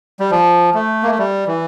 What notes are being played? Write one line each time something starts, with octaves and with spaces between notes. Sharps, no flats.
G3
F3
A3
A#3
A3
G3
E3